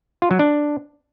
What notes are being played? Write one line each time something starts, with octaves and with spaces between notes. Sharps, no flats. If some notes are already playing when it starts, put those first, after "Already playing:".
F4
F#3
D4